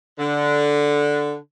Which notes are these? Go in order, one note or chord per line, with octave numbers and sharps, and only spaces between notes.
D3